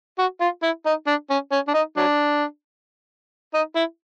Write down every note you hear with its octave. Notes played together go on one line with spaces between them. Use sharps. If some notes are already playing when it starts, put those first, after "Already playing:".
F#4
F4
E4
D#4
D4
C#4
C#4
D4
D#4
F#3 D4
D#4
E4